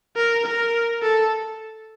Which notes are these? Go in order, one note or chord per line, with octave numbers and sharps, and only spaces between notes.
A#4
A#4
A4